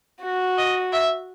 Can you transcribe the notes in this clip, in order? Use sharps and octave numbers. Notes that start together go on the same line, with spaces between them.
F#4
D#5
E5